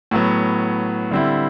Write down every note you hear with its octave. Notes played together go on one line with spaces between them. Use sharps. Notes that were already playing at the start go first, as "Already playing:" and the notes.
A2 F#3 B3
D3 G3 C4 E4